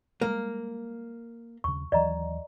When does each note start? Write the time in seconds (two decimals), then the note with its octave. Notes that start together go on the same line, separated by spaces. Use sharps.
0.21 G3 G#3 A#3
1.64 D#2 C#3 C#6
1.92 D#2 E3 F#3 D5 D#5 A#5